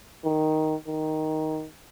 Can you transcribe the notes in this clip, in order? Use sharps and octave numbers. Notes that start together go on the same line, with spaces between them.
D#3
D#3